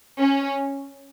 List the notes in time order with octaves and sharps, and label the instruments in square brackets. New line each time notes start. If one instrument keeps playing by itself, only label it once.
[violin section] C#4